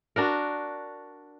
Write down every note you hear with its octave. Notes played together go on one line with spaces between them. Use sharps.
D4 F#4 A#4